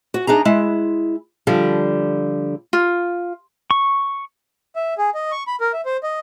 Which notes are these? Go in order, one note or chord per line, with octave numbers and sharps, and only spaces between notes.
F#4
D4 D#4 G#4 A#5
G#3 E4
D3 F3 G3
F4
C#6
E5
G#4
D#5
C#6
B5
A#4
E5
C5
D#5